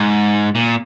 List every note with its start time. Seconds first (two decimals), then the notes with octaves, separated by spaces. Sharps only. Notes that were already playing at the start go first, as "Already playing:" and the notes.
Already playing: G#2
0.55 A#2